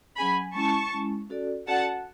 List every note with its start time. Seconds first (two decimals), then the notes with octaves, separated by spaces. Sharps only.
0.18 F#3 C#4 G#4 G#5 B5
0.55 G#3 C#4 E4 A5 C#6
0.92 G#3 C#4 E4
1.30 C#4 F#4 A4 D5
1.67 C#4 F#4 A4 D5 F#5 A5